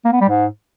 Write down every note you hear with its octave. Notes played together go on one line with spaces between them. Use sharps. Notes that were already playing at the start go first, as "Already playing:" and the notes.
A#3
B3
G3
G#2